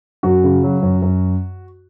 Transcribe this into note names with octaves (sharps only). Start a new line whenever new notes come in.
F#2 F#4
C#3
F#3
F#2
F#2